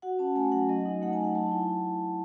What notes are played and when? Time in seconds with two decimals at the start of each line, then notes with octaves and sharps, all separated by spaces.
0.02 F#4 F#5
0.19 C#4 A5
0.35 A3 G#5
0.52 F#3 F#5
0.69 F#3 D#5
0.85 D#4
1.02 A3 F#5
1.13 G#5
1.19 F#3
1.24 F#5
1.35 F#3 A5
1.52 E4